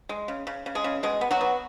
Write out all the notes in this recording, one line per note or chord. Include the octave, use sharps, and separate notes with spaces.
G#3
C#3
C#3
C#3
G#3 G#4
C#3
B2 G#3 G#4
B3
F#3 F#4
B3